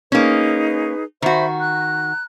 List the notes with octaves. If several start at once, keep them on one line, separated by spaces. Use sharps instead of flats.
A#3 C#4 D#4 G#4 B4
D#3 F#4 C5 E5 B5
A#5 F#6